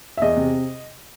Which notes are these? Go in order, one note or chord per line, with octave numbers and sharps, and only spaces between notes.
E5
E2 D#5
C3